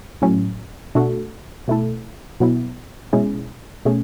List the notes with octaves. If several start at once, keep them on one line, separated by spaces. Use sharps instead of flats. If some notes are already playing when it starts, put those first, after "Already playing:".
A2 F#3 C#4
B2 A3 D4 F#4 A4
B2 A3 E4 A4
B2 F#3 B3 E4
B2 G#3 C#4 E4 G#4
B2 A3 C#4 G#4